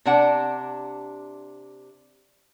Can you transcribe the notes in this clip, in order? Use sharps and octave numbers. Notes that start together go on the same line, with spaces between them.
C3 D4 F#5